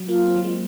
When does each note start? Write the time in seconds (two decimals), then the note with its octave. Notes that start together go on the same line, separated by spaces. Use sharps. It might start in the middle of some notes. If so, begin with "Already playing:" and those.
Already playing: F#3
0.08 A#3 F4
0.26 C4
0.36 F#3
0.44 G#3